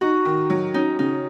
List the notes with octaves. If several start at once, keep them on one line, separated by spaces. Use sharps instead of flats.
D#4 F#4
D#3
F#3
C#4 D#4
C#3 D#4